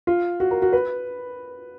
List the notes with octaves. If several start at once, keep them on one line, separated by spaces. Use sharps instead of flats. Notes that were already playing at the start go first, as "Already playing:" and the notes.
F4
F#4
A#4
F#4
B4